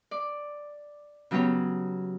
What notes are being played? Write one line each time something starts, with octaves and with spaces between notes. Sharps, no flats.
D5
C#3 F#3 B3 G4 C#5